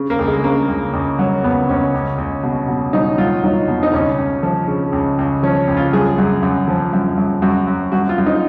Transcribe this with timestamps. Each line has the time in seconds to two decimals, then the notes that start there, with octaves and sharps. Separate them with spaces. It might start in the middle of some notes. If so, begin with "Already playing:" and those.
Already playing: C#3
0.10 A#3
0.19 C#2
0.28 G#3
0.44 C#3 A#3
0.68 C#2
0.93 C#2
1.19 F#3
1.44 C#2 B3
1.69 C#2 C#4
1.94 C#2
2.18 C#2
2.43 B2
2.68 B2
2.93 F#3 D#4
3.18 F#3 F4
3.44 F#3 D#4
3.68 B2
3.83 D#4
3.93 C#2 C#4
4.18 C#2
4.43 F3
4.67 C#3
4.92 C#2
5.19 C#2
5.43 F3 C#4
5.68 C#2
5.77 F4
5.93 F#2 G#4
6.18 F#2
6.42 F#2
6.68 F3
6.93 F#2
7.17 F#2
7.42 F#2 F#4
7.67 F#2
7.92 F#2 F#4
8.09 F4
8.18 F#2
8.26 D#4